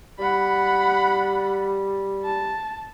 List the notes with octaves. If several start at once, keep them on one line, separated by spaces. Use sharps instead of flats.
G3 F#5 B5
A5